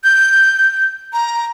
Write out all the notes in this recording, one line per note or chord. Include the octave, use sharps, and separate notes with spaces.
G6
A#5